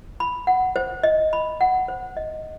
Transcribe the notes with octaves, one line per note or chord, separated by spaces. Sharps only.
B5
F#5
C5
D#5
B5
F#5
C5
D#5